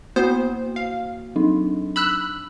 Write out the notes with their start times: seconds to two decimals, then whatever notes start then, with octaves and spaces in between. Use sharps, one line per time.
0.16 A#3 B3 F#4 C5
0.76 F5
1.36 F#3 D4 D#4
1.96 B5 E6 F#6